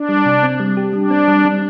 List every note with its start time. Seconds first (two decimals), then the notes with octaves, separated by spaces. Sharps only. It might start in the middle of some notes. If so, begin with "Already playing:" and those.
Already playing: D4
0.09 G3
0.26 C3
0.43 C4
0.60 G3
0.77 G4
0.93 G3 D4
1.10 C4
1.28 G3
1.45 G3